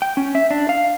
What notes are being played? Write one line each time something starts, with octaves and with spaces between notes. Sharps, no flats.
G5
C#4
E5
D4
F5